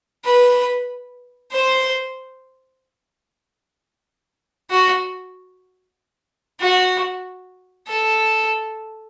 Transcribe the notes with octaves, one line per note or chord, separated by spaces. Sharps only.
B4
C5
F#4
F#4
A4